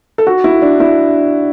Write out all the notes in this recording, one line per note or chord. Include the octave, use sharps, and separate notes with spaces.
A4
F#4
E4
D4
E4